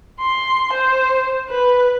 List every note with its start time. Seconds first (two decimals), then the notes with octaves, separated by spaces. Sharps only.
0.21 C6
0.73 C5
1.49 B4